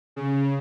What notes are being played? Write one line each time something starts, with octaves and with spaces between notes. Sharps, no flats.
C#3